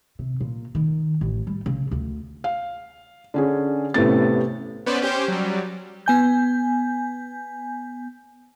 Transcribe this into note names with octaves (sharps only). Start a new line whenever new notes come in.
C3
A#2
D#3
A1
G3
C#3
D2
F5
D3 C#4 G#4
A1 A2 C3 A3 B3 A6
B3 C#4 B4 C5 D5
C#4 G4 C5
F#3 G3
B3 G#5 G6